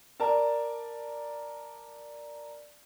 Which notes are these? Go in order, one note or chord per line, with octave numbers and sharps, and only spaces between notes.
A#4 D5 A5